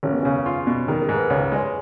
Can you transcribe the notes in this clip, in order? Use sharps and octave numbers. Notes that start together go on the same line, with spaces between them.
G#1 C#4
B3
C#3 C#4
F4
B2
D#3 G#4
A#4
G#2
B4
C#2 C#5
B4
G#3 C#5